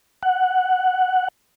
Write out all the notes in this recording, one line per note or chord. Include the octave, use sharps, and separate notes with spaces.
F#5